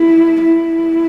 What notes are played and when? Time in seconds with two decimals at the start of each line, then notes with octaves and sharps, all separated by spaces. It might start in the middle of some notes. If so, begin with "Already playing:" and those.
Already playing: E4
0.41 E4